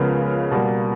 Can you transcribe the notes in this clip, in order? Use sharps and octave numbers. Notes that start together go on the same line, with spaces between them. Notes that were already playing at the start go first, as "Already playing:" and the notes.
Already playing: C#2 C#3 F3 G#3 B3 A#4
B2 G3 A#3